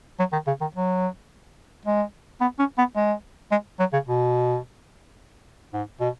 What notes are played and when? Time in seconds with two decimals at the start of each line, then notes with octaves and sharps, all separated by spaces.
0.19 F#3
0.33 D#3
0.47 C#3
0.61 D#3
0.74 F#3
1.86 G#3
2.41 B3
2.59 C#4
2.78 B3
2.96 G#3
3.52 G#3
3.79 F#3
3.93 C#3
4.07 B2
5.74 G#2
6.00 B2